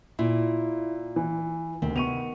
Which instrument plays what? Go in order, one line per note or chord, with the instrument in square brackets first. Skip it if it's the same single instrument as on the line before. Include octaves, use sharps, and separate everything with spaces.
[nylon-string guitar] A#2 [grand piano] E4
[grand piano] E3
[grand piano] D2 [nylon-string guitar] C3 [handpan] D#3
[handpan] B3 [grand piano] C#6 D#7 F7